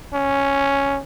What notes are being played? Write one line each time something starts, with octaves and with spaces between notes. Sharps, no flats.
C#4